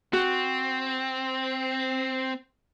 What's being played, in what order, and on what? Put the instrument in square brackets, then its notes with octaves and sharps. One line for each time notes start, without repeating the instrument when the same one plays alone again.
[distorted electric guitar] C4 [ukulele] F#4